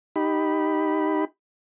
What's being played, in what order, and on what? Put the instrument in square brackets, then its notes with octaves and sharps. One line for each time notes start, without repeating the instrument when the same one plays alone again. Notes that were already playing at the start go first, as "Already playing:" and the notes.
[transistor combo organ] D#4 G4 B5